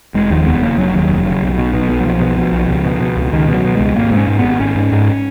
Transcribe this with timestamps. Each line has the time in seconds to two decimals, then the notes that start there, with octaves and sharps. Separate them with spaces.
0.14 F1 G#3
0.30 D#2 F3
0.46 F1 B3
0.62 C#3 A#3
0.77 F1 F#3
0.94 D#2
1.09 F1
1.26 C#3
1.42 B1
1.58 B2
1.74 B2
1.89 B1
2.00 F#3
2.05 B1 F3
2.21 B2
2.38 B2
2.53 B1
2.68 C#2
2.85 B2
3.00 B2
3.17 C#2
3.32 C#2 D#3
3.48 B2
3.54 F#3
3.65 B2
3.75 C#2 G#3
3.95 G#1 A#3
4.11 G#2
4.17 C#4
4.27 G#2
4.39 G#1 B3
4.60 G#1 C#4
4.76 G#2
4.92 G#2